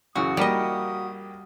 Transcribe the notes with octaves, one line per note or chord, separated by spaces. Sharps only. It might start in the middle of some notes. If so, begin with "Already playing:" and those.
F#2 C#3 E3 F#4 D#6
A#1 G3 A#3 G4 D#5